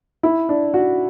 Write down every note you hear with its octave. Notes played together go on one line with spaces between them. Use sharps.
E4
D4
F#4